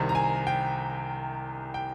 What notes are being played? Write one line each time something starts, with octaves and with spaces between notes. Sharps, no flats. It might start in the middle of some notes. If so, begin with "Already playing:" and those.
Already playing: C2 C3 D#3
A#5
G#5
G5
G5